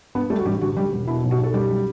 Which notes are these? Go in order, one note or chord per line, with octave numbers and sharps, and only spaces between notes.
G2 B3 B4
G3 A3 A4
F#4
A1 G3 G4
D2 F#4
F#3 G3 G4
E1
B2 E4
B1
F#4
B1
A4
F#2 G3 G4
F#3